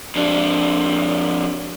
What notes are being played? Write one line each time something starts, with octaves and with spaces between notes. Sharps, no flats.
F2 D4